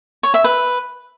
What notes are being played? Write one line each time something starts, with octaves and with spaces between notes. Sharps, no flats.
C#5
E5
B4